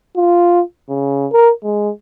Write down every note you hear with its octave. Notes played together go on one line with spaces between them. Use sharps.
F4
C#3
A#4
G#3